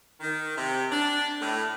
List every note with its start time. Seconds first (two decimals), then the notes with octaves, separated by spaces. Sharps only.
0.20 D#3
0.56 C3
0.91 D4
1.40 A2